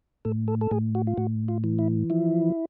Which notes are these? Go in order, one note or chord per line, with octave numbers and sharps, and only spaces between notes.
A2 A4
A4
A4
A2 G#4
F#4
F4
A2 F#4
F4
E3
E4
F3 E4